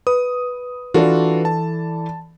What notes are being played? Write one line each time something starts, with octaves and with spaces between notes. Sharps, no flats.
B4 D#6
E3 D4 F4 F#4 A4 D5
A5